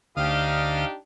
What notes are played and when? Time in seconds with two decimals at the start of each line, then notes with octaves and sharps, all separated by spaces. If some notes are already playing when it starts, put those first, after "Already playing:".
0.17 D2 D4 D#4 G4 F5 D#6 F6